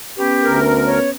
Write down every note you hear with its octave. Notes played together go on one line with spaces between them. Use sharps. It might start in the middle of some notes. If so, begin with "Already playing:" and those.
B3 C#4 G4 B4
D2 A#4
C#5